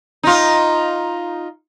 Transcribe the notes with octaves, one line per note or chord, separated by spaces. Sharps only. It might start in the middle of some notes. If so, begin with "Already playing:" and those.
D#4 F4